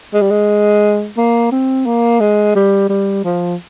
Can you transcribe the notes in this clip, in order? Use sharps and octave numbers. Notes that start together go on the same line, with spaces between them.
G#3
G3
G#3
A#3
C4
A#3
G#3
G3
G3
F3